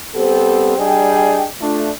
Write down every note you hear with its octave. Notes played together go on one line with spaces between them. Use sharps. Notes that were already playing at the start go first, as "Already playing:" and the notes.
G3 B3 C4 G4 A4 C5
G3 D4 G#4 D#5 G5
A3 D4 F4